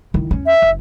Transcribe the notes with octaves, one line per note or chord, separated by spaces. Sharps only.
D#3 E4
E2 C#4
E5
F#1